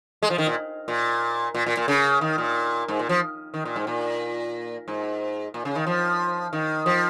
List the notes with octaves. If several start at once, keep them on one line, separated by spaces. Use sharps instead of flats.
G#3
F3
D#3
A#2
A#2
A#2
A#2
A#2
C#3
D#3
A#2
G#2
A#2
F3
D#3
A#2
G#2
A#2
G#2
A#2
C#3
D#3
F3
D#3
F3